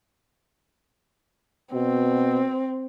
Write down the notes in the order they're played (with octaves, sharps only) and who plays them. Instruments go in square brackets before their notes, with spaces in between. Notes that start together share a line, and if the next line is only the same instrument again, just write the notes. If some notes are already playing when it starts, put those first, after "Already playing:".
[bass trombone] B2 [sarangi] C4